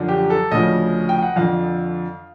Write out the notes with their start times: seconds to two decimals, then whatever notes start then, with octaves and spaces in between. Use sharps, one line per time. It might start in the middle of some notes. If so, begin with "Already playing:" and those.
Already playing: F#2 D3 F3
0.08 G4
0.30 A4
0.51 D2 C#3 F3 D#5
1.09 G5
1.23 F#5
1.36 F2 D3 F3 F5